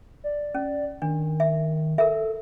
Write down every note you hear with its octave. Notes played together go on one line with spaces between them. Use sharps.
D5
C#4
D#3 D4
E5
A4 A#4 E5